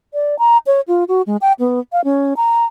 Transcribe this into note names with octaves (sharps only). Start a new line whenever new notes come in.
D5
A#5
C#5
F4
F#4
G#3
G5
B3
F5
C#4
A#5